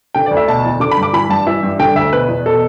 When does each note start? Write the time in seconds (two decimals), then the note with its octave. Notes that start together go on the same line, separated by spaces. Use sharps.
0.14 D3 G5
0.26 D5
0.31 D2
0.37 E5
0.48 B2 A5
0.65 E2
0.80 D3 D6
0.92 B5
0.97 G2
1.03 D6
1.13 E3 B5
1.29 G2 A5
1.47 E3 E5
1.63 G2
1.79 D3 G5
1.96 D2 E5
2.12 B2 B4
2.28 E2
2.46 B2 A4